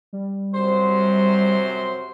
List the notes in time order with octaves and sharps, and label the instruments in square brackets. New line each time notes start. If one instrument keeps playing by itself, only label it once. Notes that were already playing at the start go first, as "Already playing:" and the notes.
[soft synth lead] G3
[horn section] F#2 C3 C5